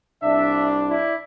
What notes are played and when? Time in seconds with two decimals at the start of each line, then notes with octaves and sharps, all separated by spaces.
0.23 C2 D4 E5
0.89 E4 D5